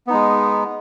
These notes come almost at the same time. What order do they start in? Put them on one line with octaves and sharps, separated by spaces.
B3 D#4 G#3